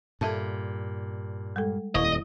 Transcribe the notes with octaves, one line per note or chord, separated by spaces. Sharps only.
G2 A#2 A4 E5 A5
G3 G#3 A4
D#1 F2 E4 D#5 C#6